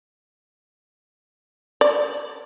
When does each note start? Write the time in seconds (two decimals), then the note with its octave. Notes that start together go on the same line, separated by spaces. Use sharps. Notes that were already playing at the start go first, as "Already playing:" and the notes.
1.81 D5